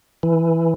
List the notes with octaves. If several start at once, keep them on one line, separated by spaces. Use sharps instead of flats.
E3